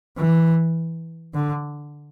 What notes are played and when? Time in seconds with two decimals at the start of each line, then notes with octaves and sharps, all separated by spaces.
0.17 E3
1.34 D3